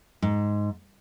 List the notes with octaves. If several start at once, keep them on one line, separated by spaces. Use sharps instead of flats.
G#2